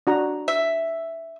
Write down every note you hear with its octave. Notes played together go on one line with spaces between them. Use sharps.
D4 F#4 A#5
E5